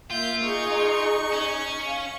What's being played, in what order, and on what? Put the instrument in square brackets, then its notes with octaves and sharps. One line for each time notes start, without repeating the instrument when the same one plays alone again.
[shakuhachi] A#3 [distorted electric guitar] F4 [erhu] E5 [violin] G6
[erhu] D#4 [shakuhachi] G#4 [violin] C#6
[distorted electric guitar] C#4
[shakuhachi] F5